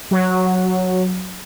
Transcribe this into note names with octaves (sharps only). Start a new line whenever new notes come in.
F#3